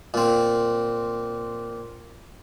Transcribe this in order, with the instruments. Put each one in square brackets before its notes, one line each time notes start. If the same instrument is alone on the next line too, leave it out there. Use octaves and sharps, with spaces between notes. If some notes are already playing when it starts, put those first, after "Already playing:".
[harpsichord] A#2 C4